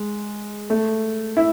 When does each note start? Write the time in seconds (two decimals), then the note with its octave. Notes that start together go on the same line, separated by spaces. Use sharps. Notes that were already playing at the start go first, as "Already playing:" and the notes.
Already playing: G#3
0.70 A3
1.37 E4